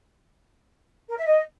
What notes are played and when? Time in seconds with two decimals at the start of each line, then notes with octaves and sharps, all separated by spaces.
1.08 A#4
1.17 E5
1.25 D#5